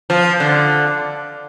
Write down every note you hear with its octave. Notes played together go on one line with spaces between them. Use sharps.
F3
D3